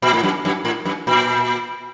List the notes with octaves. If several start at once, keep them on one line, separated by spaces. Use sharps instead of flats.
A#2
A2
F#2
F#2
A2
F#2
A#2